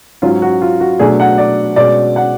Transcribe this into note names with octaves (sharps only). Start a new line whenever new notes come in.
G#2 F#3 C#4 F4
F#4
F4
F#4
B2 F#3 A3 D4 G#4
F#5
D5
B2 G#3 C#4 D5
F#5